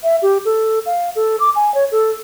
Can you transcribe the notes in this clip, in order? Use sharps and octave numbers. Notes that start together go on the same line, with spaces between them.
E5
G4
A4
F5
A4
D6
G#5
C#5
A4